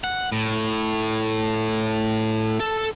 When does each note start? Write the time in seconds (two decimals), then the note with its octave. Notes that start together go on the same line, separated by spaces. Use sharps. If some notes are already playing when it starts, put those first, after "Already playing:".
0.04 F#5
0.32 A2
2.60 A4